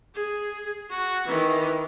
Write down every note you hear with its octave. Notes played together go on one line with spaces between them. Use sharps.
G#4
F#4
D#3 E3